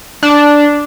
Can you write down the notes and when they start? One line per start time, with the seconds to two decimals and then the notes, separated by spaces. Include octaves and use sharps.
0.23 D4